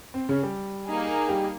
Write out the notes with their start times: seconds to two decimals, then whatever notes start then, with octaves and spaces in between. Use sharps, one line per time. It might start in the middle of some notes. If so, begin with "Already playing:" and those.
0.14 C4
0.29 C#3 C#4
0.43 G3 G4
0.86 A#3 D#4 G#4
1.28 G3 G4